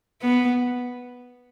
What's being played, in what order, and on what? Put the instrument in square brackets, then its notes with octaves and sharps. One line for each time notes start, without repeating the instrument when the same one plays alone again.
[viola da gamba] B3